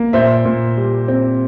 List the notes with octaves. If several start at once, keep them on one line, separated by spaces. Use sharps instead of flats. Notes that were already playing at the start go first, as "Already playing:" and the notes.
Already playing: A#3
A#2 C5 E5
A#2
G3
C4